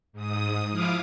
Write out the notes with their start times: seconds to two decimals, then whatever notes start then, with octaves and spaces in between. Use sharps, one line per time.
0.13 G#2 D#6
0.72 F3 E4 F5 D6 D#6 F6